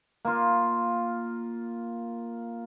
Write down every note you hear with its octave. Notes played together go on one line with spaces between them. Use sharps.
A#3 F4